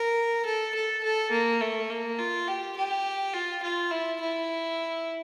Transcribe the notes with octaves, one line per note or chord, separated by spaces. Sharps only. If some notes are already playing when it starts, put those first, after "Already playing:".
Already playing: A#4
A4
A4
A4
A#3
A3
A#3
F4
G4
G4
F4
F4
E4
E4